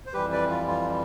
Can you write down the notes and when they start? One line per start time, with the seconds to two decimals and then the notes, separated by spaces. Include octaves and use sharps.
0.06 C5
0.13 F2 E3 G3 G4 B4
0.32 B4 D5
0.50 F4
0.68 F4